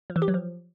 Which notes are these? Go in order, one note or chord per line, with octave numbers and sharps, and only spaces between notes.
F3
E3
G4
F#3
F3